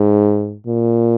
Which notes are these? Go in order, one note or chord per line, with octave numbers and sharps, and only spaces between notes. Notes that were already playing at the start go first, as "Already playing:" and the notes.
Already playing: G#2
A#2